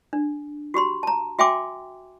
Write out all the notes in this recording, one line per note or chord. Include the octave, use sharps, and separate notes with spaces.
D4
F#4 G4 B5 C6
A5 A#5
F#4 E5 G5 G#5 C6 D6